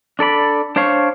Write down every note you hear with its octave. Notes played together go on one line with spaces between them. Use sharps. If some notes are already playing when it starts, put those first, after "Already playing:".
D4 A4 D5 B5
D4 C5 C#5 F5 C#6